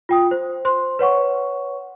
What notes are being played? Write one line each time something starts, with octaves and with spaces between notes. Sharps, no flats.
F4 G5 D#6
C5
C5 C6
B4 C#5 F#5 C#6